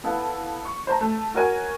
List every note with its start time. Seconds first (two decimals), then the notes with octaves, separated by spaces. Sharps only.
0.04 B3 E4 A4 F5
0.65 C#6
0.87 C5 A5 A#5
1.01 A3
1.35 F#4 A#4 C#5 G#5